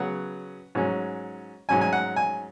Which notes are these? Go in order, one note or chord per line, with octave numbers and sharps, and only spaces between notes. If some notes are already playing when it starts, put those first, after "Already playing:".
Already playing: C#3 F#3 B3 F#5
G#2 F#3 C#4
G#2 F#3 C#4 G#5
G#5
F#5
G#5